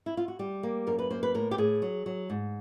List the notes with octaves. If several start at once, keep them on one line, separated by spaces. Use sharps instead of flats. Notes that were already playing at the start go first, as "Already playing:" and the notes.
E4
F4
F#4
G3 G4
A#3
F#2 A#4
B4
A#3 C5
B4
A2 A#4
G4
A2 G#4
F#3
F#3
G#2